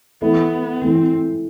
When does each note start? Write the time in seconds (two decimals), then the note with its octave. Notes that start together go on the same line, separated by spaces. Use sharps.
0.22 E3 A3 B3 E4
0.81 E3 A3 C4 E4